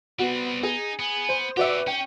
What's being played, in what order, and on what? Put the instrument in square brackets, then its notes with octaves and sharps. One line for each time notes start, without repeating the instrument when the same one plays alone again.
[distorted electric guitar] G3 C4 [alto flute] B3 [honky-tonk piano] F#4
[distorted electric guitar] D#4 [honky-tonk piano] G#4
[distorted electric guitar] B3 [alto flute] G#5
[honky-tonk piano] C5
[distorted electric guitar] C#4 G4 [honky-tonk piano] F#4 D5 E5 [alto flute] B4
[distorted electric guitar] C#4 [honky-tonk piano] G5